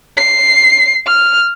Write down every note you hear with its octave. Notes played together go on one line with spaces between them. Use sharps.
C7
F6